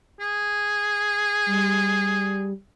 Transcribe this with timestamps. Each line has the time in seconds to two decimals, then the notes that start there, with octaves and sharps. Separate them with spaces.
0.20 G#4
1.46 G3